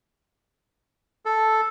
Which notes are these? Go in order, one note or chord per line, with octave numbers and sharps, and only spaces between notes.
A4